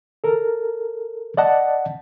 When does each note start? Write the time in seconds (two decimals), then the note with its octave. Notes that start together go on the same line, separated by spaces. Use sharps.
0.24 A4 A#4
1.37 D5 D#5 F#5 A5